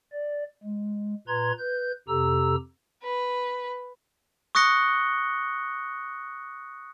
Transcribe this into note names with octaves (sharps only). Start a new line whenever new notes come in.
D5
G#3
A#2 B4 A#5 C6 G#6
B4 G6
F2 C3 G4 A4 A#5 E6
B4
C#6 D#6 F#6 A#6 C#7 G7